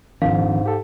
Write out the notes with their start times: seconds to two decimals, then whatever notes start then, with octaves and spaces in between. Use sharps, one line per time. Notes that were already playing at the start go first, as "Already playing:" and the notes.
0.22 D#1 G#2 D#3 F3 C4 D4 F5
0.66 G4 A4